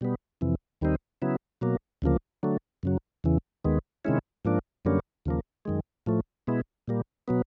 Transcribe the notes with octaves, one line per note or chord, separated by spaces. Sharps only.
B2 G3 B3
F2 C3 E3
D#2 D#3 G3 C4 D#4
C#3 F#3 B3 E4
B2 F#3 A#3
D2 C#3 F3 A#3
D3 F#3 A3
F#2 C#3 F#3
E2 C#3 E3
D#2 D#3 G#3 B3
C3 D#3 G#3 C#4 E4
G#2 F3 A#3 D4
F#2 D3 G3 A#3 C#4
D#2 C#3 F3 A#3
F#2 D#3 G#3
A2 F3 A3
B2 G#3 B3 E4
A#2 G3 A#3
B2 F#3 B3